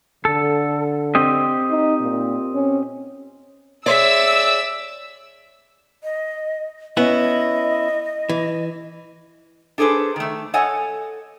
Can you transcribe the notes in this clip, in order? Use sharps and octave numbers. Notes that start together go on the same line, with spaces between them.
D3 A4
C4 G4 D#5
D#4
A#2
C#4
G#4 C#5 D5 E5 E6
D#5
B3 C#4 E4 D#5
E3
D4 G#4 A4 B4 C5
D#3 A3
A4 C#5 D#5 F#5 G#5